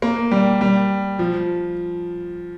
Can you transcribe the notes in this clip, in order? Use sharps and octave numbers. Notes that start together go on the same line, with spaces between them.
A#3
G3
G3
F3